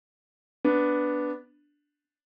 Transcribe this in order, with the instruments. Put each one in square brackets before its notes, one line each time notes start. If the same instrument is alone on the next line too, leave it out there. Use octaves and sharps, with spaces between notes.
[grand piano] B3 D4